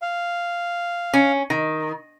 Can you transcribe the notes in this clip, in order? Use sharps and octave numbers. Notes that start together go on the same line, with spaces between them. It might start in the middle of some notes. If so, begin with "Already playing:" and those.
F5
C#4
D#3